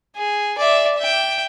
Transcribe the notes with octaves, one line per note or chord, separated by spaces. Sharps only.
G#4
D5 E5
E5 G5